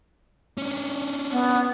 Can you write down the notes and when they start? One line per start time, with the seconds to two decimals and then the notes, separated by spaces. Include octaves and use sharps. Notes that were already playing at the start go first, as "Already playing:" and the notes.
0.58 C#4 D4
1.31 B3